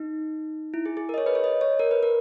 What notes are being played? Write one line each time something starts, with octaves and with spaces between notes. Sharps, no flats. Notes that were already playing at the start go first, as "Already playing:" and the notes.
Already playing: D#4
E4
G#4
G#4
A#4
D#5
C#5
B4
C#5
D#5
C#5
A#4
B4
A#4